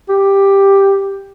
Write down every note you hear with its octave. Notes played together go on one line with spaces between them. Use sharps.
G4